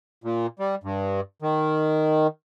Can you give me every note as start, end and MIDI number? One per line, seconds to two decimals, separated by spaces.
0.24 0.47 46
0.59 0.75 55
0.84 1.21 43
1.42 2.27 51